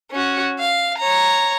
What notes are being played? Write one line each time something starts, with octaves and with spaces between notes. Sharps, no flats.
C#4 F#4
F5
C#5 A#5